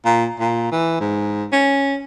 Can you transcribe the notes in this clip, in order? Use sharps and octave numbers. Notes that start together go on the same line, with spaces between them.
A#2
A#2
E3
G#2
C#4